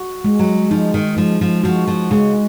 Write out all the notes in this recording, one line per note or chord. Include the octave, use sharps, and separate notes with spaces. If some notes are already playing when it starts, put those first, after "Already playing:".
Already playing: F#4
G#3
F#3
F3 D#4
D#3
F3 G#3
F3
F3 F#4
F3
C#3 G#3